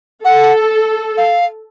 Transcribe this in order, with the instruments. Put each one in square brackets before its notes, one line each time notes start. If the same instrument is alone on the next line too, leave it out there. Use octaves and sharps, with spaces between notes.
[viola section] A4 [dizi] F#5
[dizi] F5